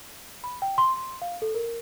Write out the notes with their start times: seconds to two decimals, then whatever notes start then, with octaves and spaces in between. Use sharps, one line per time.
0.44 B5
0.62 G5
0.78 C6
0.97 C6
1.22 F5
1.42 A4
1.55 A#4